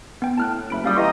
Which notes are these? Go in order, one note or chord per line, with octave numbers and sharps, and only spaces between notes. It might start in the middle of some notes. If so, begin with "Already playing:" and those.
B3 G5
A2 A5 F6 F#6
F#1 E5 B5 D7
G3 C#4 F5 D#6
E3 G4 D#5 A#5 C6 C#6